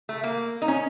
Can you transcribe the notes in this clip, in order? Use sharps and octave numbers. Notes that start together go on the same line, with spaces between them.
A3
A#3
D#4
C#4